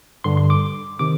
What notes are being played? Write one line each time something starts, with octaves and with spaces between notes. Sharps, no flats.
G2 D3 C6
C6
D6
C3 D#3 D6